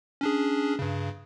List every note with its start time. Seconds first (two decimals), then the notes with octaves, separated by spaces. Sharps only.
0.21 C#4 D4 G#4
0.79 G2 C#3